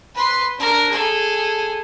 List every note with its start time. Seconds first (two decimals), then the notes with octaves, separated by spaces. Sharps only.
0.15 B4 C6
0.58 D4 A#4
0.89 G#4 A4